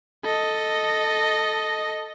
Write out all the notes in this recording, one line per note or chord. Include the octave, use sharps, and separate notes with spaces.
A4 D#5